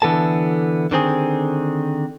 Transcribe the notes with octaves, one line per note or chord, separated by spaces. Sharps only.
D3 E3 B3 A4 A5
D3 D#3 C4 G#4